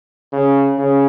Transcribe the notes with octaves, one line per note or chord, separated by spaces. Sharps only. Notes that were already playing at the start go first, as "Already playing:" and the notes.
C#3
C#3